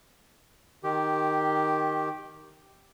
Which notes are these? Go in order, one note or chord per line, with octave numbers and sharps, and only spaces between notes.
D#3 G4